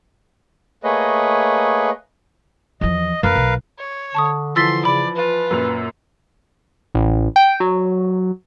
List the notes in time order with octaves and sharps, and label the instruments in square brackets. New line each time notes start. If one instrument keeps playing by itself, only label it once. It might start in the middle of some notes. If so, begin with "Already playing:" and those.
[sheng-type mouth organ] A3 A#3 G#4 B4 C#5 D#5
[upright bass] E2 F3 [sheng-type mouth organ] D#5
[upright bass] F#2 F#3 [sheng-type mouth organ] A#4 B4 F5
[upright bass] B1
[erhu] C#5
[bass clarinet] D3 [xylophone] A5 C#6 D#6
[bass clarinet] D3 [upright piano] E3 F3 [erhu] C6 [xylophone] E6 A6 B6
[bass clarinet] C#3 [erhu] D5 [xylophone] B5
[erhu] F4 [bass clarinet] B4
[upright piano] F#2 A#2 F7
[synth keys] A1
G5
F#3